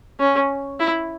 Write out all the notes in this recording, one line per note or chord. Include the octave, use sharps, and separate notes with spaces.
C#4
E4